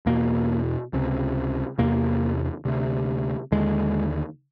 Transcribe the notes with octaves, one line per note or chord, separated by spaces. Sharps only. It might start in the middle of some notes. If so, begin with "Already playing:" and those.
E2 B2 A#3
C#2 C3
E2 C3 A#3
D2 C3
D#2 D3 G#3